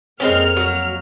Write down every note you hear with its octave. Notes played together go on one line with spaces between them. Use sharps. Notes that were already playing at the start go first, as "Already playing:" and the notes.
F2 G#3 A#3 C4 C#4 F6
F#3